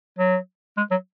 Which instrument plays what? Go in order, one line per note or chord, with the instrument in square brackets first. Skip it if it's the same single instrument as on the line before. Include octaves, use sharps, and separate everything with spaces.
[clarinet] F#3
G#3
F#3